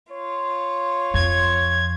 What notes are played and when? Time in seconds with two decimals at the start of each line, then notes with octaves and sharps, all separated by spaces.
0.11 F4 C#5
1.14 F2 G#6